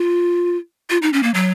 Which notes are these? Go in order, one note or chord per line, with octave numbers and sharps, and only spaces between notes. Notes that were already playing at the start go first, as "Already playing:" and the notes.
Already playing: F4
F4
D#4
C#4
A#3
F#3